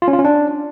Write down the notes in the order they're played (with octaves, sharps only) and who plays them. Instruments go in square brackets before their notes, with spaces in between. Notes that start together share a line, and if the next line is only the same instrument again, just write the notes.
[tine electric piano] F4
C#4
F4
C#4
D4